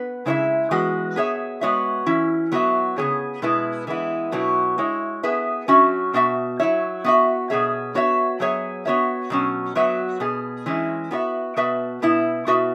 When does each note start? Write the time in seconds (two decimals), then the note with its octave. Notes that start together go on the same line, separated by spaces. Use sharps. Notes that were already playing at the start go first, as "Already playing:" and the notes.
Already playing: B3 B4
0.26 C#3 G#3 E4 C#5 E5
0.71 E3 G#3 B3 F#4 B4
1.16 B3 G#4 C#5 E5
1.61 G#3 B3 F#4 C#5 E5
2.06 E3 C#4 E4
2.52 F#3 B3 F#4 E5
2.98 C#3 E3 B3 G#4 C#5
3.42 B2 G#3 B3 E4 B4
3.87 E3 G#3 B3 E4
4.32 B2 F#3 B3 E4
4.78 G#3 E4 C#5
5.23 B3 G#4 B4 E5
5.68 F#3 C#4 F#4 E5
6.14 B2 B3 F#4 E5
6.60 F#3 E4 C#5 E5
7.04 B3 F#4 E5
7.50 B2 B3 G#4 C#5 E5
7.95 B3 F#4 C#5 E5
8.40 F#3 B3 G#4 C#5 E5
8.86 B3 F#4 C#5 E5
9.30 B2 F#3 C#4
9.75 F#3 B3 F#4 B4 E5
10.20 B2 B3 G#4
10.66 E3 G#3 C#4 E4
11.11 B3 F#4 C#5 E5
11.57 B2 B3 F#4 B4 E5
12.02 B2 B3 E4
12.47 B2 B3 F#4 B4 E5